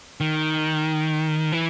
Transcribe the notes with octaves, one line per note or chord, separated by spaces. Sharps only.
D#3
E3